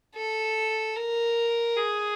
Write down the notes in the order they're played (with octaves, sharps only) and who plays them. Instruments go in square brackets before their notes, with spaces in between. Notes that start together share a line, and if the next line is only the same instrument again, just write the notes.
[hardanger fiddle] A4
A#4
G#4